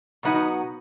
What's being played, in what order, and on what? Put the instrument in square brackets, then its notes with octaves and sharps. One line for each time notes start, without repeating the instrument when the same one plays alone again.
[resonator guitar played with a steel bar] B2 F#3 B3 D#4 F#4